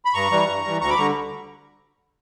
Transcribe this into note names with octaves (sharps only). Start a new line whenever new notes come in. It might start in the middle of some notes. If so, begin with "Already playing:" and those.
B5
G2 A#5 C#6
E3 G3
G2
E3 G3
D2 A#5 C#6
B5 D6
D3 G3 A#5 C#6